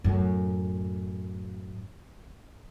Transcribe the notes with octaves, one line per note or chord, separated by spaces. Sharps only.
F#2 A2